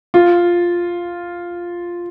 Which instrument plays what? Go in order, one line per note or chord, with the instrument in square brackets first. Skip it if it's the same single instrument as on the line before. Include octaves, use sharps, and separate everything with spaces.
[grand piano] F4